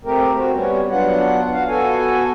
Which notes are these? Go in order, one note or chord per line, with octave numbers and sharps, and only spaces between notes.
A3 C4 G4 A#4
C4 F#4
G3 B3 C#4
F#3 B3 D4 F4 F#5
F#4 F5
B3 F#4 A4 G#5